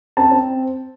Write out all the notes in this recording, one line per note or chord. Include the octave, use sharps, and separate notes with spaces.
C4 A5
C4